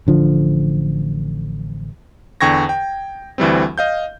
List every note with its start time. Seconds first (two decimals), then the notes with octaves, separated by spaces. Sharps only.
0.07 A1 D3 F3
2.41 E2 D3 G5 C#6 G#6 A#6
2.69 G5
3.38 D2 E3 G3 C4
3.78 D#5 F5 G6